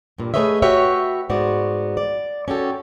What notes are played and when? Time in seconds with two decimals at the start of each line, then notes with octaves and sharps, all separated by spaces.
0.18 G2 A#2
0.34 A3 G#4 B4 C#5 D#5 E5
0.62 F#4 G4 B4 C#5 E5
1.30 G#2 B3 F#4 D5
1.97 D5
2.48 C#4 F#4 G4 A4